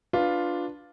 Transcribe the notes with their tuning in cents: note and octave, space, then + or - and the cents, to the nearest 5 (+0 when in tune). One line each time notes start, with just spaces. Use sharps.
D4 +0 F4 +5 B4 +0